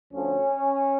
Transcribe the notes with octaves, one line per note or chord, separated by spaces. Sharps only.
D2 D3 F3 C#4